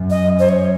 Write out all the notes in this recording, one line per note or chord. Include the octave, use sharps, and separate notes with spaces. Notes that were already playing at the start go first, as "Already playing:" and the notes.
Already playing: F#2
D#5
C5
C#5